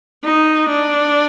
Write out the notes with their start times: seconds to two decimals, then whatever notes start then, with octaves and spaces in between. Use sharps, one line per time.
0.24 D#4
0.69 D4